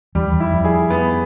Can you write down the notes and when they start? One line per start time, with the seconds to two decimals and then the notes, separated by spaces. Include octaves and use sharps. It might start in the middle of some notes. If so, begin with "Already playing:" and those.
0.15 E2 G3
0.32 E2
0.40 E4
0.53 F2
0.65 G#4
0.90 B3